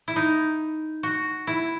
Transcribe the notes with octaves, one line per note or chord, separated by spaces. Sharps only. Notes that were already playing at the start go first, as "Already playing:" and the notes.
E4
D#4
F#4
E4